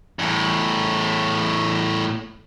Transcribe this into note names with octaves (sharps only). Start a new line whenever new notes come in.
E2 A2